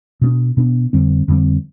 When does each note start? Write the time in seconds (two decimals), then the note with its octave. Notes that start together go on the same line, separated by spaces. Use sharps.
0.21 B2 B3 D4
0.57 B2 B3 D4
0.93 F2 D3 G3 C4
1.28 F2 D3 G3 C4